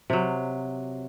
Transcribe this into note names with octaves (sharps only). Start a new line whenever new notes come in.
C3 F#3